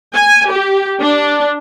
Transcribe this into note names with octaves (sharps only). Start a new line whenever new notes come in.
G#5
G4
D4